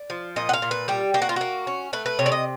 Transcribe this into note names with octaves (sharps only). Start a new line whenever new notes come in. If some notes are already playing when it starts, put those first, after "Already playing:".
Already playing: D5
F3
A#2 D#5
F#5
F5
A#2
B4
G3 G4
A#3 G4
F#4
F4
A#3 F#4
C#4
A3 B4
B4
C3 C#5
D5
D#5